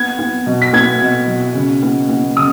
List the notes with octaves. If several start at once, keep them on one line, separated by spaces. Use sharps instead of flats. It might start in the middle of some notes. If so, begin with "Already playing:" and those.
Already playing: B3 G#6
B3
B2
B6
B3 G#6
B2
B2
C#3
B3
B3
C#3 D#6